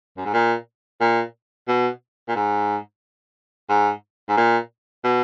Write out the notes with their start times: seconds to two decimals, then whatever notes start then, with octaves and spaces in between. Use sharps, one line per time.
0.17 F#2
0.25 G#2
0.33 A#2
1.01 A#2
1.68 B2
2.28 A#2
2.36 G#2
3.69 G#2
4.29 G#2
4.37 A#2
5.04 B2